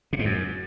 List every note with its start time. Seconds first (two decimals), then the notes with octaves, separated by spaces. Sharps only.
0.13 C3
0.19 G#2
0.25 F#2